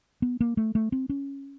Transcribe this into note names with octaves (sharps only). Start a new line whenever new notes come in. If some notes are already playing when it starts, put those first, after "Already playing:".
B3
A#3
A3
A3
C4
C#4